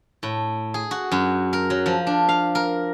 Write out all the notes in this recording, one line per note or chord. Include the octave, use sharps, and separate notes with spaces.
A2
G#4
F#4
F#2
A#4
F#3
F3
D4
F5
A#4